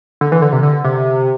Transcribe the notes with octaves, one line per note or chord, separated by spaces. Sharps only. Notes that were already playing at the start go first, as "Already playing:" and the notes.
D3
E3
D3
C3
D3
C3